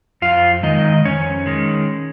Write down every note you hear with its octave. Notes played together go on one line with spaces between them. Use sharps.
F2 F4 F5
D#3 G#3 D#4 D#5
F2 C#4 C#5
D#3 G#3